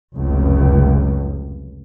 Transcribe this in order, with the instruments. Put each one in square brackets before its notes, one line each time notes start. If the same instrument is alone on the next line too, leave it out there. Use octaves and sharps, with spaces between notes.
[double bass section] F1 C#2 F#2